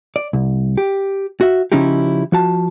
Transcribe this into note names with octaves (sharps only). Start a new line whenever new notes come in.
D5
C2
G4
F#4 E5
C#3 F3 C#4 D#4 E4 G4
F3 F#4 A5